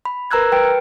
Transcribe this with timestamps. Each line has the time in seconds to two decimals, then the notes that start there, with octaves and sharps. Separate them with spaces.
0.05 B5
0.31 A#4 B4 A#5 E6 F#6 G#6
0.52 B4 G5 F6 D7